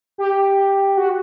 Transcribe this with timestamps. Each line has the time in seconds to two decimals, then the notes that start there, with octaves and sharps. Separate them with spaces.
0.18 G4
0.98 F#4